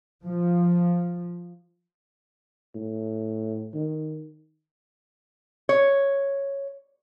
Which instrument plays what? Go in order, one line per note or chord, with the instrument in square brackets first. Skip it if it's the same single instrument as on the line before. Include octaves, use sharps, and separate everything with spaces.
[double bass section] F3
[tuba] A2
D#3
[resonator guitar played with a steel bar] C#5